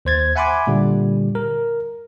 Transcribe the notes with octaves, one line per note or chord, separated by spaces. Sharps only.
D#2 C5 G#6 A6
E5 F#5 G#5 B5 C6 D6
A#2 D3 G3
A#4